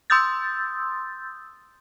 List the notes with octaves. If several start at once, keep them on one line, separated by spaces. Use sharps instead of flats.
C6 D#6 E6 G6 A6